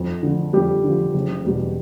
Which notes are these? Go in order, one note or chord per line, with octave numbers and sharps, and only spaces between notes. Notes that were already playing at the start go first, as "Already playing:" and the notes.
Already playing: F2
D3 F3
F2 G3 G4
D3 F3
F#1
E2 B2 G3